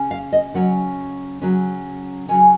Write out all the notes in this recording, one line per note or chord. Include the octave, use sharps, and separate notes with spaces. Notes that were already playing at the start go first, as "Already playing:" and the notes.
Already playing: C#3 C#4
F5
D#5
C#3 F#3 C#4 F#5
C#3 F#3 C#4
C#3 F#3 C#4 G#5